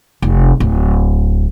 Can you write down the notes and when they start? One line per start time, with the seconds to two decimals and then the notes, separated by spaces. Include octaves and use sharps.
0.22 F1
0.60 D1